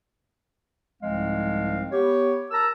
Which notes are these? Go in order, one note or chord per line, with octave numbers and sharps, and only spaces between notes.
C2 G#2 F3 G#3 C4 F5
B3 G4 C#5
A#4 A5 A#5 E6